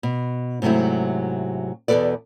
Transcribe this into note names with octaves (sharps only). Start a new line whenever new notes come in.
B2
G#2 C3 F#3 A3 E4
E2 B2 A#3 A4 B4 D5